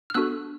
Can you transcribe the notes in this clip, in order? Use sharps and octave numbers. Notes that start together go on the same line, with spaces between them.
F6
B3 D4 F#4 A4 E6 F#6